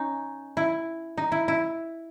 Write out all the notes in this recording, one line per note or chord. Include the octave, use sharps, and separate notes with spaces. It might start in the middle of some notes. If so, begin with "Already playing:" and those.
Already playing: C#4 D#4
E4
D#4
E4
E4